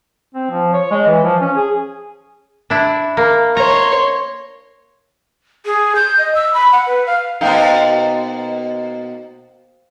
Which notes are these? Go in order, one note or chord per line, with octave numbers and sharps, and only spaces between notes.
C4
F3
C#5
G#3
E3
F3
C#4
G#4
D4 E4
A#3
C#5 A#5 C6
G#4
G6
D#5
E6
B5
F#5
B4
F5
B2 A#3 D#4 C5 F5 G5